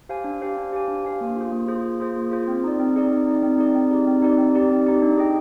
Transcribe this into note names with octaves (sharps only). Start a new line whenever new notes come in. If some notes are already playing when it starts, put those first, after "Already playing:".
G4 C5 F5 G#5
D4
G4 C5 F5 G#5
D4
G4 C5 F5 G#5
D4
G4 C5 F5 G#5
A#3
F4 G#4 C5
A#3
F4 G#4 C5
A#3
F4 G#4 C5
A#3
F4 G#4 C5
C4
D#4 G#4 D5
C4
D#4 G#4 D5
C4
D#4 G#4 D5
C4
D#4 G#4 D5
C4
D#4 G4 D5
C4
D#4 G4 D5
C4
D#4 G4 D5
C4
D#4 G4 D5
D4
G#4 D#5 G5